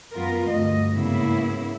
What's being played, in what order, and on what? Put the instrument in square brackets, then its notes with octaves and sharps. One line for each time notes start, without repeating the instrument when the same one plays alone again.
[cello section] F#2 B3 F4 A#4
D2 G2 D#5
G#2 C#3 A#3 B3 E4